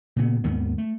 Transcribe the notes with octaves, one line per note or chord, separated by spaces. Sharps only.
A#2 C#3 B3
D#2 G#2 D#3 B3
A3